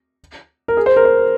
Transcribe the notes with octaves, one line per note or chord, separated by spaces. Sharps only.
A#4
G#4
C5
A#4
C5